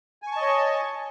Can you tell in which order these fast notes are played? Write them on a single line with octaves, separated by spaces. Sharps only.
G#5 C#6 A5 D#5 C#5